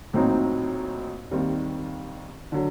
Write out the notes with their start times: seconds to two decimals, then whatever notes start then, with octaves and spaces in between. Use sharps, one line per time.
0.13 A#1 A2 F#3 C4 D#4
1.31 D#2 D#3 G3 C4
2.52 D3 F#3